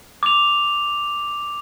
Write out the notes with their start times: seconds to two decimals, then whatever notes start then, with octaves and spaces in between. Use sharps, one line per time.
0.23 D6 F7